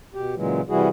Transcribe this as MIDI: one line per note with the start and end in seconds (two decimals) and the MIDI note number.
0.14 0.34 47
0.14 0.34 67
0.36 0.61 46
0.36 0.61 49
0.36 0.61 52
0.36 0.61 54
0.36 0.61 56
0.69 0.89 48
0.69 0.89 52
0.69 0.89 55
0.69 0.89 64
0.69 0.89 66
0.69 0.89 68